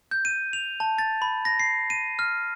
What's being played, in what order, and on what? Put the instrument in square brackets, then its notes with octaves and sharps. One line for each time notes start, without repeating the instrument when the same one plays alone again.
[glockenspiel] G6
D#7
F7
A5
A6
B5
A#6
C7
D#7
F6